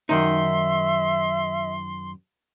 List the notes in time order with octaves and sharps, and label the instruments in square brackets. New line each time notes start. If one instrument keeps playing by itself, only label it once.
[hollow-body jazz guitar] F#2 D#3 D#4 [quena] E5 [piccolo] C6